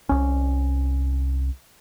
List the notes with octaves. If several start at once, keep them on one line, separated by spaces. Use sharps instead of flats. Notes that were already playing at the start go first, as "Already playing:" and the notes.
C2 C#4